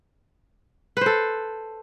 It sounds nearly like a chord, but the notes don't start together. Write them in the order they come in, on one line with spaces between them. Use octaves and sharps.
B4 C5 A4